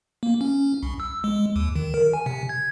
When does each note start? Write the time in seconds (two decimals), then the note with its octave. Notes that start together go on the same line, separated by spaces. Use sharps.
0.23 A#3
0.41 C#4
0.83 C2
1.00 E6
1.24 G#3
1.56 D#2
1.76 D#3
1.94 A#4
2.13 G#5
2.26 C3
2.49 G#6